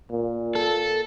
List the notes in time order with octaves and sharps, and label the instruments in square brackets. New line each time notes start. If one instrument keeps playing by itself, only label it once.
[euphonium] A#2
[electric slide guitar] A4